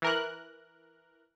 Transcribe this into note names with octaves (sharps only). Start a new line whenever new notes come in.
E3 A#4 F#6